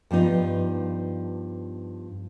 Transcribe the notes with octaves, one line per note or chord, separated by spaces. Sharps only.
G2 F3 B3 D#4